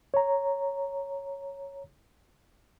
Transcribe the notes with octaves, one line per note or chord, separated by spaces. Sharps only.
C#5 A#5